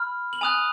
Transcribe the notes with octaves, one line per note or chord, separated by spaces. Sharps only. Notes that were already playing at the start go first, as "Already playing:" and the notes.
Already playing: B5 F6
F#7
G#5 D#6 F#6 F7